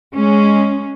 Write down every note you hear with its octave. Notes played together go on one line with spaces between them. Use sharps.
G#3 C#4